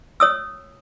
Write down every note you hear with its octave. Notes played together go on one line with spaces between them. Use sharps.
C#5 D#6 E6